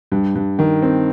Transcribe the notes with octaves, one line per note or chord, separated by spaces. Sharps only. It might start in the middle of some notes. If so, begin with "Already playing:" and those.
G2
G2
D#3
C4